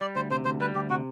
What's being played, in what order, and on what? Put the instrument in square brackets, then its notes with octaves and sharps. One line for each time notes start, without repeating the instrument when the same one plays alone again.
[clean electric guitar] G3 [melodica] D5
[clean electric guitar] D2 [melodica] C5
[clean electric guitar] C3 [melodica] C5
[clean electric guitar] D2 [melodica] C5
[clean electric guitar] G3 [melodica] B4
[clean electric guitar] D2 [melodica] G4
[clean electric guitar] C3 [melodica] F#4